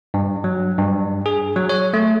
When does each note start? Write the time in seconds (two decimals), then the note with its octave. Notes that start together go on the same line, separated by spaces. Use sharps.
0.14 G2
0.44 F#3
0.78 G2
1.26 G#4
1.56 F#3
1.69 C#5
1.94 A3